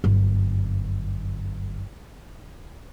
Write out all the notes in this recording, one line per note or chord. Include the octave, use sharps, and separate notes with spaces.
G1 F#2